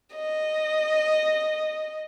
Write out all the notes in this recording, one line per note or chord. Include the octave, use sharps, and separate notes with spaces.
D#5